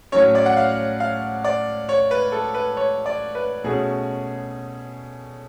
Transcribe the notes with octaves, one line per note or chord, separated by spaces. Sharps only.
A2 F#3 C#4 C#5
D5
F#5
F5
F5
D5
C#5
B4
A4
B4
C#5
D5
B4
B2 A3 C#4 G#4